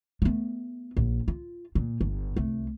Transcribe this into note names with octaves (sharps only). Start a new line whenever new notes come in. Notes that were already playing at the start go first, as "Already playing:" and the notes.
A3 B3
A#1
F4
A#2
G1
C2 A3